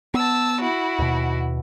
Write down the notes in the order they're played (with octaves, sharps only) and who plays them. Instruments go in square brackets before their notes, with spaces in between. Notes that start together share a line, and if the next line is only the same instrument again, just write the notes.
[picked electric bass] B3 [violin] A5 E6
[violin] E4 F#4
[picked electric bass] D#2 B2